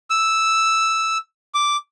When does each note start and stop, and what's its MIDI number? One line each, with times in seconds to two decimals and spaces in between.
0.10 1.18 88
1.54 1.77 86